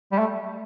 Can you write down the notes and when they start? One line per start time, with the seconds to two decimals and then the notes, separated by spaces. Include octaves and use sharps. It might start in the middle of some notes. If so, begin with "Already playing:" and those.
0.12 G3
0.18 A3